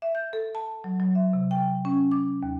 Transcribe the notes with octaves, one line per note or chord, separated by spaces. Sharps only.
E5
G6
A4
A5
F#3
F#3
E5
C3
G5
C#4
D6
D#2